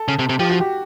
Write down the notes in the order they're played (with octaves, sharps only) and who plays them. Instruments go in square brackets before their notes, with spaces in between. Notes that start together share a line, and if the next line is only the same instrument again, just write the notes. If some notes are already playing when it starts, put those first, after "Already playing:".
Already playing: [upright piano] A4
[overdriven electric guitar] C#3
C3
C3
[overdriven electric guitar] F3 [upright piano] G4
[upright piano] F#4
G4